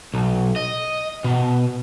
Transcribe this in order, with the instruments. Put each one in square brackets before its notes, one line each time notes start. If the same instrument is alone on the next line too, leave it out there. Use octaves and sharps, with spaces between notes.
[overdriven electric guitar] B1
D#5
B2